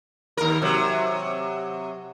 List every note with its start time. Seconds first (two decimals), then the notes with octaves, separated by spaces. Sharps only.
0.37 D#2 A#4
0.62 C3 F#3